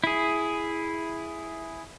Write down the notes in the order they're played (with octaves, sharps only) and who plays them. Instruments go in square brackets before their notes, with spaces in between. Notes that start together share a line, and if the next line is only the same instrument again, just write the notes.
[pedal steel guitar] E4 G#4